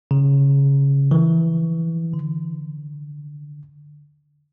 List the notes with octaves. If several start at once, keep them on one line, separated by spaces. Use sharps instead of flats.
C#3
E3
D3